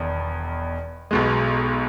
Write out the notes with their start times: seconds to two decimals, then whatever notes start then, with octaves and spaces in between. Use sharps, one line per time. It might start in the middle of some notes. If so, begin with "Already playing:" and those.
Already playing: E1 E2 D#3
1.11 B1 B2 G#3